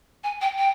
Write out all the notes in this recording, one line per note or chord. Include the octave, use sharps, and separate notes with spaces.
G#5
G5
G5